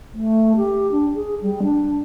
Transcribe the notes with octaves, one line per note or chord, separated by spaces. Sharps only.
A3
G4
D4
G#4
G3
D4